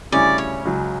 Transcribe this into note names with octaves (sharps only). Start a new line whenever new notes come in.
D2 C#3 G3 C#4 E4 D5
C#5
C#2 C#3 F#3